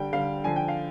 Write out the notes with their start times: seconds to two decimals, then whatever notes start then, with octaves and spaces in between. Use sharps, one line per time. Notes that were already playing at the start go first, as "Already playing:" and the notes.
Already playing: D3 G3 G5
0.13 D3 G3 F5
0.44 D3 F3 G#5
0.56 G5
0.68 F5